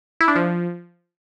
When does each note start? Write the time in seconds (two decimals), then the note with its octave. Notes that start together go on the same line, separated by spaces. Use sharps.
0.21 E4
0.28 D4
0.35 F3